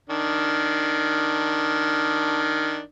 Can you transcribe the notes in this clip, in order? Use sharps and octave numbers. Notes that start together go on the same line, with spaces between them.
D#3 D4